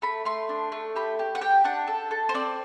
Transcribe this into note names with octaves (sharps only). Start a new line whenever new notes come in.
A3 B5
A3 C6
D4
A3
G4 B5
G4
F#5
G4 G5
D4 F#5
A4
A4
C5
C4 D5